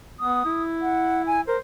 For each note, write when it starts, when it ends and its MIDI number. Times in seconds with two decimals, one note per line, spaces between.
0.20 0.45 59
0.20 0.63 87
0.45 1.41 64
0.82 1.22 78
1.26 1.41 80
1.47 1.57 70
1.47 1.58 72